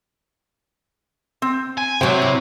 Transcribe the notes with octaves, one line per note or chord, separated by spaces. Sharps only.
C4
G#5
C3 F#3 C4 G5
E4